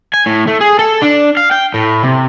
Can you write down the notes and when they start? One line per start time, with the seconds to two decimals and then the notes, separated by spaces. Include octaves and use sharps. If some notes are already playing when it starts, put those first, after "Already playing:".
0.14 G#5
0.26 A2
0.47 A3
0.61 G#4
0.79 A4
1.02 D4
1.37 F5
1.51 G5
1.74 A2
2.03 C3